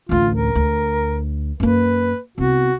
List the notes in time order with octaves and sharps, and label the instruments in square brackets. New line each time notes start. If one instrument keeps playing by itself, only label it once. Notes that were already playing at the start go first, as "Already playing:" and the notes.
[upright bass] A1 D2 [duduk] F4
[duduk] A#4
[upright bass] D2
[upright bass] F#2 A#3 [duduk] B4
[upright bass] C2 B3 [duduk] F#4